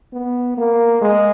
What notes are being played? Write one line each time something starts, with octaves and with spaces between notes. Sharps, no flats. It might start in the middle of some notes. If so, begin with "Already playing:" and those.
B3
A#3
G#3